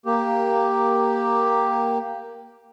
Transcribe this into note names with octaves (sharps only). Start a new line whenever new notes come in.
A#3 G4